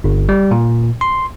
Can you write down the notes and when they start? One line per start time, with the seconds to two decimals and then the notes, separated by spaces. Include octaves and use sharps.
0.04 G1
0.29 G3
0.51 A#2
1.01 C6